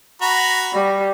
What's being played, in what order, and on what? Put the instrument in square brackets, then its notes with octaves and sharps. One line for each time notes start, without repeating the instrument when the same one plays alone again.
[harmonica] F#4 A#5 B5
[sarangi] G3